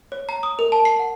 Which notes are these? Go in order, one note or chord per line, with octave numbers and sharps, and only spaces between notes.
C#5
A#5
D#6
A#4
A5
C7
F#5